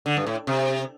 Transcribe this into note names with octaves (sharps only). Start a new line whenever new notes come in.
D3
G2
A2
C3